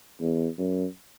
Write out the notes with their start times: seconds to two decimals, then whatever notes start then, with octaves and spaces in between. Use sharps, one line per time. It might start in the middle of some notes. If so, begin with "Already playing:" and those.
0.21 E2
0.58 F#2